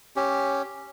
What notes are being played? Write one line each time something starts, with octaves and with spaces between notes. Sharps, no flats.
C#4 G4